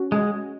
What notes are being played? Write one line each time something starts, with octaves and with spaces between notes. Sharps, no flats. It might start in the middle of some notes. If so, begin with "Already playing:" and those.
Already playing: C#4 F#4
G#3